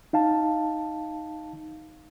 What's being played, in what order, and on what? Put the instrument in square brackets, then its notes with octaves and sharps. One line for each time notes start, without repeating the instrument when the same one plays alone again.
[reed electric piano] D#4 F5 A5